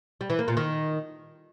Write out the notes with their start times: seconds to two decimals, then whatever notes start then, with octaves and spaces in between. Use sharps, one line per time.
0.21 G3
0.30 E3
0.39 A#3
0.48 A#2
0.57 D#3